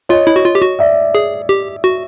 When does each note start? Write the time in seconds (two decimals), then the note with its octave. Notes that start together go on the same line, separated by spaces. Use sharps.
0.09 F4 C#5 D#5
0.27 E4
0.36 F#4
0.45 F4
0.55 G4
0.62 F#4
0.79 D5 E5
1.15 G#4
1.49 G4
1.84 F#4